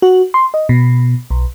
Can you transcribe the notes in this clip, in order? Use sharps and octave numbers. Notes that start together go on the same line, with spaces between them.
F#4
C6
D#5
B2
B1